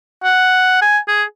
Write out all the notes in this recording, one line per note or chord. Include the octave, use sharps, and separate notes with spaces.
F#5
G#5
G#4